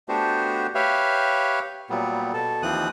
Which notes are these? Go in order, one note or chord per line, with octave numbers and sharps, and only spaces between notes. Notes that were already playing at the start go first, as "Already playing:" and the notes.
A3 B3 D4 F#4 G4 C5
G4 B4 C#5 E5 F5
A#2 F#3 G3 B3
B2 A4
D#2 E3 F3 C4 D#6 F#6